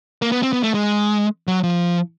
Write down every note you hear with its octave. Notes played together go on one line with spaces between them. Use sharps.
A#3
B3
C4
B3
A3
G#3
F#3
F3